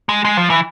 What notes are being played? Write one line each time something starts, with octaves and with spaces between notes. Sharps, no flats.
G#3
G#3
F3
E3